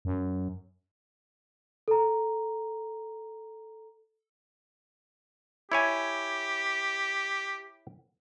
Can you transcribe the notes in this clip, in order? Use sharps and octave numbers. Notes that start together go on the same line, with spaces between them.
F#2
A4 A#5
E4 G4 C#5 G#5